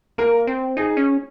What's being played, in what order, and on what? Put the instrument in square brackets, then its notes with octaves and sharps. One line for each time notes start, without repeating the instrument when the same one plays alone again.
[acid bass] A#3 [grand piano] A#4
[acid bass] C4
[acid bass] D#4 [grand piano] G#4
[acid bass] C#4